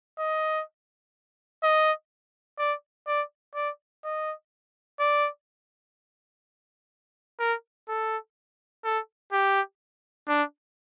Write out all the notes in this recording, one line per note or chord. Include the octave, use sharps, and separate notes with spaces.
D#5
D#5
D5
D5
D5
D#5
D5
A#4
A4
A4
G4
D4